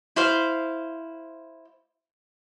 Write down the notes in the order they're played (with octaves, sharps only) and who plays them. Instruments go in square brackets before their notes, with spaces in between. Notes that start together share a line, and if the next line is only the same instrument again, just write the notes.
[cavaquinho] E4 C5 F5